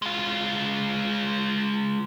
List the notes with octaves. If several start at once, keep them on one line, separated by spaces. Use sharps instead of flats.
G#3 F4